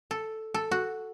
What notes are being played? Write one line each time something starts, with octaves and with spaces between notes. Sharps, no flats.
A4
A4
F#4